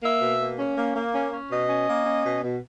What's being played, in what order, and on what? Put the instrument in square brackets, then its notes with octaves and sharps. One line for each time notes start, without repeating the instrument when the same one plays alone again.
[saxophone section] A#3 E5
B2
A#3
C#4
A#3
A#3
C#4
C#4
B2 D#5
C#4
A#3
C#4
B2
B2